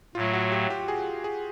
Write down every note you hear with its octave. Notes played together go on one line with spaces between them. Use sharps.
A2 F#3 A3 F4
F#4
G4
G4
G#4
G#4